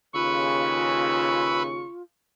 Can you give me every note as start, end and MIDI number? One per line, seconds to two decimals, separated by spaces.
0.14 1.84 39
0.14 1.84 49
0.14 2.03 65
0.14 1.63 71
0.14 1.63 83
0.14 1.90 85
0.14 1.63 88